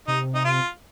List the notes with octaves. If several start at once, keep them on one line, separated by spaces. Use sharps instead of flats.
C3 D#4
D#4
F4